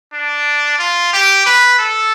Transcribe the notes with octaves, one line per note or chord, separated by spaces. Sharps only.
D4
F4
G4
B4
A4